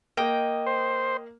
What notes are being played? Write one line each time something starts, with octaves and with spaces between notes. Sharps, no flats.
A#3 D#5 G5
C5